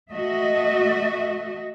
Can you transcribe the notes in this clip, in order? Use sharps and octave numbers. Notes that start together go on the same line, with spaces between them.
A3 F#4 D#5 E5